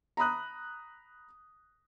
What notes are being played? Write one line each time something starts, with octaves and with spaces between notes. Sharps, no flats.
A#5 B5 D#6 F#6